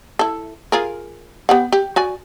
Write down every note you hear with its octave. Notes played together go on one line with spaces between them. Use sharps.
E4 A4
F4 G#4 A#4
B3 G4 F#5
G4
F#4 D5 G#5